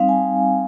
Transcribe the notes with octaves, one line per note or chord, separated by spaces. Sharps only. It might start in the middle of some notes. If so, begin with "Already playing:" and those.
Already playing: G3 C4 D#4 F5
G#5